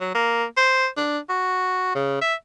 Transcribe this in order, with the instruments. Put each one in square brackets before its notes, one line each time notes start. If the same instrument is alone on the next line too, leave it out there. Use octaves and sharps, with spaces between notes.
[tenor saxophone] F#3
A#3
C5
D4
F#4
C#3
E5